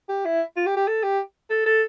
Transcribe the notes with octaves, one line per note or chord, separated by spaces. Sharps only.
G4
E4
F4
G4
G4
A4
G4
A4
A4